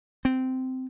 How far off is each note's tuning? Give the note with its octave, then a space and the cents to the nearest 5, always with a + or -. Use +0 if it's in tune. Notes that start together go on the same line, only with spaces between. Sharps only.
C4 -15